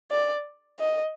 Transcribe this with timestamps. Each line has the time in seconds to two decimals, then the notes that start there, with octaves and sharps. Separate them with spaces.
0.11 D5
0.80 D#5